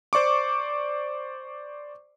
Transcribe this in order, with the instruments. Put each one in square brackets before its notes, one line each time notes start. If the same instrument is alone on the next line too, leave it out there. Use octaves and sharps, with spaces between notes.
[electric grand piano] C5 D5 C#6 D6